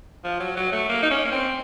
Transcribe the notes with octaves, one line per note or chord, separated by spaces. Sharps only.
F3
F#3
F#3
A3
A#3
D#4
C#4
A#3
C4